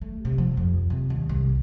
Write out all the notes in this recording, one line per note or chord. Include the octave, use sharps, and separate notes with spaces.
A3
C3
F3
F2
C3
D#2
C2